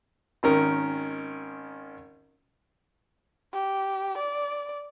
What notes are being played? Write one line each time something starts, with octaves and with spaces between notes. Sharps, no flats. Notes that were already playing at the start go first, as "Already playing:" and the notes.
G#1 D#3 C#4 A#4
G4
D5